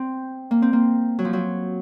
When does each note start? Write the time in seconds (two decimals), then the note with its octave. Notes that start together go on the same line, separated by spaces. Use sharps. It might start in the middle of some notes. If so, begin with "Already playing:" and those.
Already playing: C4
0.51 A#3
0.62 C4
0.73 A#3
1.19 F#3
1.25 F3
1.33 F#3